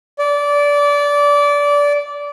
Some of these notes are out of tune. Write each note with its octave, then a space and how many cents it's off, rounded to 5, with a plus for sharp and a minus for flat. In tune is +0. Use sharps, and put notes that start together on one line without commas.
D5 -20